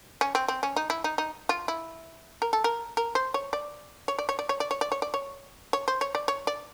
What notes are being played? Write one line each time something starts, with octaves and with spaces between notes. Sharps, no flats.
C#4
C4
C4
C#4
D#4
E4
D#4
D#4
F4
E4
A#4
A4
A#4
A#4
C5
C#5
D5
C#5
D5
C#5
D5
C#5
D5
C#5
D5
C#5
D5
C#5
C#5
C5
C#5
D5
C#5
D5